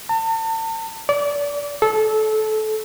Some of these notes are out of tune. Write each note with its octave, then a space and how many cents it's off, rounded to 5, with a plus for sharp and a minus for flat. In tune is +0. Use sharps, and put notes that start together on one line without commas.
A5 +40
D5 -30
A4 -20